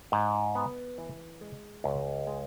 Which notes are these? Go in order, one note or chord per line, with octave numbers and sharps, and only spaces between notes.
G#2
B3
E3
G#3
C#2
G#3